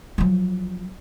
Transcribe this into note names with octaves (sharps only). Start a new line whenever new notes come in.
F3 F#3